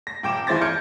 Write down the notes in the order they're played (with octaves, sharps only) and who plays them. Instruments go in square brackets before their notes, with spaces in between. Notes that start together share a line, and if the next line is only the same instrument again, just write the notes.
[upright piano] A#6
D#1 G5 D6 E7
D#2 E3 E4 C5 A6 A#6
F6 G6 G#6 C#7 D7